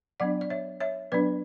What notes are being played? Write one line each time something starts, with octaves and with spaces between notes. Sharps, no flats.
F#3 B3 D4 D5 F#5
D5
C#5 E5
C#5 E5
F#3 B3 D4 B4 D5